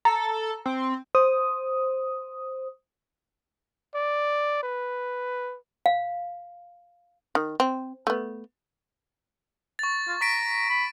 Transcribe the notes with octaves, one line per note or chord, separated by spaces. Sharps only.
A4 A#5
C4
C5 D#6
D5
B4
F5
D#3
C4
A3 B3
C#6 A6
F4
A#5 C#6 B6 D7
B5